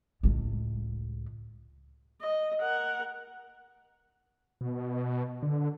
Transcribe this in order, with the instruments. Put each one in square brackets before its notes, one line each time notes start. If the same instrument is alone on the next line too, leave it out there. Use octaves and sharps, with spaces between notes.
[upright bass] C#2 A2
[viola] D#5
A#4 F#5
[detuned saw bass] B2
D3